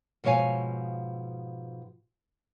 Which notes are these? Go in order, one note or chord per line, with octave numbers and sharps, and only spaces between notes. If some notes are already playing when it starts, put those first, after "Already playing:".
G#2 B2 F3 C#5 F5 G#5